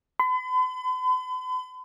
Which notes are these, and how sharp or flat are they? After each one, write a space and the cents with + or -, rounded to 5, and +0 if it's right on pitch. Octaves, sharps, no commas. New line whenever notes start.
B5 +45